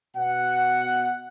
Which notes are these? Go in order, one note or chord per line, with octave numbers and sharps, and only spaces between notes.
B2 F#5